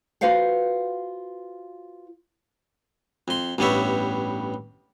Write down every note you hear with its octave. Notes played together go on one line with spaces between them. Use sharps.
F4 F#4 B4 C5 F5 F#5
F2 C6
A1 G2 G3 B3 C#5 E5